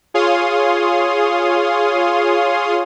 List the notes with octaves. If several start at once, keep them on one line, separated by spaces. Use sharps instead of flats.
F4 G#4 C#5 F5 C6 D#6